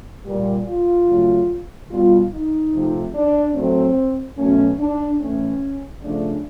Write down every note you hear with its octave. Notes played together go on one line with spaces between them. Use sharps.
A#2 G3
F4
C#3 F#3 A3
B2 G3 F4
D#4
C3 F3 A3
D4
A2 F#3 A3 C4
B2 F#3 A3 C#4
D4
A2 E3 A3 C#4
C#3 F3 A3 D4